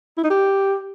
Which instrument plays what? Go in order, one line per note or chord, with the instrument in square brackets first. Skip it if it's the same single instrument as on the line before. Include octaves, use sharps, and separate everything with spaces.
[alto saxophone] E4
D#4
G4